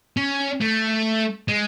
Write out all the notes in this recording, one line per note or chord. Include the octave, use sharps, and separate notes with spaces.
C#4
A3
G#3